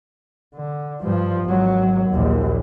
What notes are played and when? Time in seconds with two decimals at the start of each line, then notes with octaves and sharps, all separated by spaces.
0.56 D3
1.03 G2 F3
1.46 G#1 F#3
2.10 A#1 D#2